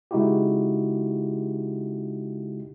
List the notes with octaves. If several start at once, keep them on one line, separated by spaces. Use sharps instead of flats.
C#3 G#3 D#4 E4 F#4 G4